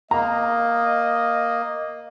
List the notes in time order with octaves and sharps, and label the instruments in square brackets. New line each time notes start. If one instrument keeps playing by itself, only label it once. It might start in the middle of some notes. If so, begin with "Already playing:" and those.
[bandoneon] A#3 [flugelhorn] D#5 [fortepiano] A#5